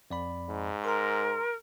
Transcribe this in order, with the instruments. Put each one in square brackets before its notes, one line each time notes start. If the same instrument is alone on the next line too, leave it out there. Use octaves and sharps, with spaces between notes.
[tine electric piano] F2 D5 B5
[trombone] G#2
[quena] A#4 [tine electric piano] A#5 C6